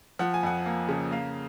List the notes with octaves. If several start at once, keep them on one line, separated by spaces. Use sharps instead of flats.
F3 F#5
G#5
F2 F#5
A#3
C#3
A#3 F5